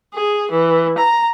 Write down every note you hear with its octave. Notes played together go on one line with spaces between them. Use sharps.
G#4
E3
A#5